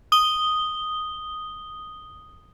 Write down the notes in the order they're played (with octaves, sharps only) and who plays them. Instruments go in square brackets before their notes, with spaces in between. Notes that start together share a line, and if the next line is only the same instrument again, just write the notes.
[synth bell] D#6 G7